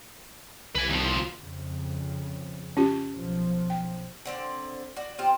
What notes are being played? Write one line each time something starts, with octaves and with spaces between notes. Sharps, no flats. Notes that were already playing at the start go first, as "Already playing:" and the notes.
C2 B4 G#5
D#2 F3
F2 C#3
C#4 F4 G4
B1 F3
G5
D3 C4 D5
F#4 D5
C4 F4 G4 C5